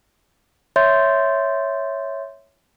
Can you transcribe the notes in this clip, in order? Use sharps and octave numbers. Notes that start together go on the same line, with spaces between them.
C#5 E5 C6 G6 A6